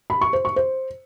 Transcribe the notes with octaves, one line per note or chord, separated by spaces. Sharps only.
B5
C#6
C5
C#6
C5